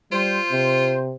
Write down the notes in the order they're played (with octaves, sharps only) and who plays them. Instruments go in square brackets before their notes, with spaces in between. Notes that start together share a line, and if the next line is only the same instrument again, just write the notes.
[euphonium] G3 [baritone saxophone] F4 [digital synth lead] C5
[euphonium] C3